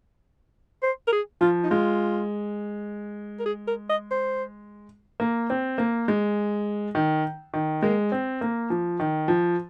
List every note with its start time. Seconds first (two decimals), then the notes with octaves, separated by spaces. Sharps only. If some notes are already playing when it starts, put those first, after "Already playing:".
0.83 C5
1.07 A#4
1.12 G#4
1.41 F3 F4
1.64 D#4
1.70 G#3 F4
3.40 A#4
3.46 G#4
3.67 A#4
3.89 D#5
4.11 C5
5.20 A#3
5.50 C4
5.78 A#3
6.08 G#3
6.95 D#3
7.54 D#3
7.83 G#3 A#3
8.12 C4
8.41 A#3
8.70 F3
9.00 D#3
9.28 F3